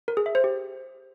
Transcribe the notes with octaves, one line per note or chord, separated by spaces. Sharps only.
A#4
G#4
E5
C5
G4